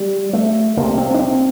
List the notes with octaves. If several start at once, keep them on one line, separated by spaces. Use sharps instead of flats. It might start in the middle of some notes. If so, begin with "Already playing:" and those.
Already playing: G3
A3
C2 C3 A#3
C4
D4
C4